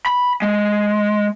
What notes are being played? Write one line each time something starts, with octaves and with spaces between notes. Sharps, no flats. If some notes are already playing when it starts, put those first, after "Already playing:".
B5
G#3